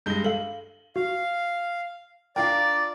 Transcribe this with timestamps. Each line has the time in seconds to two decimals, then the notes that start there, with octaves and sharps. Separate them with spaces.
0.06 G2 G#3 G6 A#6 G7
0.24 A4 F5 F#7
0.96 F#4 F5
2.36 D4 F4 A#4 D5 F5 G5